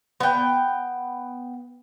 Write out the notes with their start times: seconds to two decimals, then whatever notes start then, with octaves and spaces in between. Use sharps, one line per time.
0.20 B3 G5